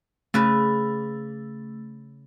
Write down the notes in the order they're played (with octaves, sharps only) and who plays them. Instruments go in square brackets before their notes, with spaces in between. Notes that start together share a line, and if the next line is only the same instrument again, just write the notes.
[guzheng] C#3 B4 [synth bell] A3